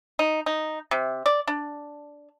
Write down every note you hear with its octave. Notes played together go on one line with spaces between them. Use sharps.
D#4
D#4
C3
D5
D4